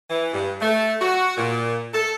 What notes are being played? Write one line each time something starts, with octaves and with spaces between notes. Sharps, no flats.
E3
G2
A3
F#4
A#2
A4